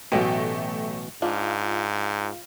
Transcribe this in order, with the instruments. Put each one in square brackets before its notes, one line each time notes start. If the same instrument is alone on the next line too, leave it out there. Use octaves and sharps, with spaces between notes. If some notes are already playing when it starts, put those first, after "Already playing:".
[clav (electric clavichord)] A1 B2 [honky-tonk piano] F#3 A3 G4
[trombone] G#2 [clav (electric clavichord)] D4 [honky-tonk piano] F4